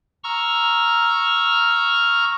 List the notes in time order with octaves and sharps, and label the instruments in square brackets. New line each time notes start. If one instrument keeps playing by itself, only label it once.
[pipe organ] A#5 C#6 E6 F6